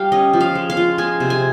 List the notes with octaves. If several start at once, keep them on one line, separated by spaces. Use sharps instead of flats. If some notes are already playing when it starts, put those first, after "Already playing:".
Already playing: G3 F5
C#4 D#5
F3
F5
G#3
F5
F4
G#3 G#5
C3
G#5